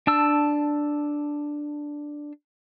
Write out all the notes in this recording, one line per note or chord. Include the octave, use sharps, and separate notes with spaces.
D4 A5 E6